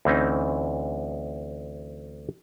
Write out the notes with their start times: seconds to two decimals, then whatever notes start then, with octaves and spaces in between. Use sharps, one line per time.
0.05 D2 E3 C4 C#4 D#4